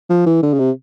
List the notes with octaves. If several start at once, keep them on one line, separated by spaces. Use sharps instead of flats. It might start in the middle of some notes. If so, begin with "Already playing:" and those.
F3
E3
D3
C#3
C3